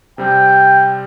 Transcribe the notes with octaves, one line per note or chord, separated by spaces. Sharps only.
C3 G3 C4 G5